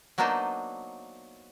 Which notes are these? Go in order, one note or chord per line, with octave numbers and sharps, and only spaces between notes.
F#3 A#3 B3 D4 D#4 C5